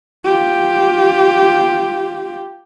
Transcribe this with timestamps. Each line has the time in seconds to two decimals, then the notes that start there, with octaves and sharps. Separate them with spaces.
0.25 F4 G4